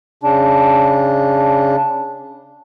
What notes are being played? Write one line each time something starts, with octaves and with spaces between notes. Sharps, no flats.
C#3 D4